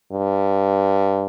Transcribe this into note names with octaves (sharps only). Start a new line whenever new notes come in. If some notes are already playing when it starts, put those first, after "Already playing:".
G2